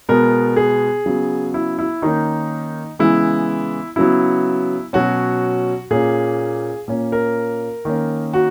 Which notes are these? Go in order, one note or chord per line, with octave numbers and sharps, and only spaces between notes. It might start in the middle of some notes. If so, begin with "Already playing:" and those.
B2 G#3 B3 A#4
G#4
C#3 F#3 B3
E4
E4
D#3 A#3 C#4 D#4
C#3 E3 G#3 B3 E4
C#3 F#3 B3 E4
B2 F#3 C#4 F#4
A#2 A#3 C#4 G#4
A#2 A#3 C#4
A#4
D#3 A#3 C#4
F#4